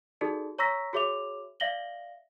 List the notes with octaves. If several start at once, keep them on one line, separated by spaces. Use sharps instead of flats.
D#4 F#4 G#4 A4 D5
C#5 A#5 C#6 E6 A#6 B6
F#4 G#4 C#5 E5 D6 F7
D5 E5 F5 A#6 F#7 G7